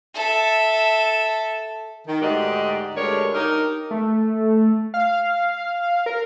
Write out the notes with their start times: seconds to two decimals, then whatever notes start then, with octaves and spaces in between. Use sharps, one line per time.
0.14 A4 E5
2.08 D#3
2.22 D2 G#2 F#4 G4 D5 D#5
2.95 D2 G2 G#3 D4 A#4 C#5
3.34 D#4 G4 A#4
3.91 A3
4.94 F5
6.06 A#4